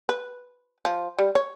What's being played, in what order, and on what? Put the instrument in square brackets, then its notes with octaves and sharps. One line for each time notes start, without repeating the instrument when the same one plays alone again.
[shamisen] B4
F3
G3
C#5